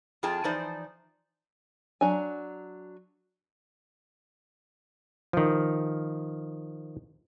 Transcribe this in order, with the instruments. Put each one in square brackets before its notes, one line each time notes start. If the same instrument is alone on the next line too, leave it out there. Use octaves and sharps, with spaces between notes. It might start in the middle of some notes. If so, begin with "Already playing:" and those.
[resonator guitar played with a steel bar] F2 F4 G#4 G5 A5
E3 F3 D#4 C5 D5
[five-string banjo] F#3 D4 G#5
[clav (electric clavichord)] D#3 F3